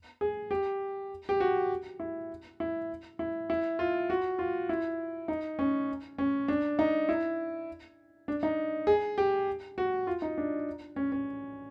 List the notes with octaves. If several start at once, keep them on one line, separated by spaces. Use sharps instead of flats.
G#4
G4
G4
F#4
E4
E4
E4
E4
F4
F#4
F4
E4
D#4
C#4
C#4
D4
D#4
E4
D4
D#4
G#4
G4
F#4
F4
D#4
D4
C#4
C#4